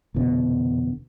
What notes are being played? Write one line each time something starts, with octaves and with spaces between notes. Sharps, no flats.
F1 E2 B2 D3